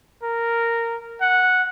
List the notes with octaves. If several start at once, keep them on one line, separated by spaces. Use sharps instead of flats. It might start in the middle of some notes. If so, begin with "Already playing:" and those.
A#4
F#5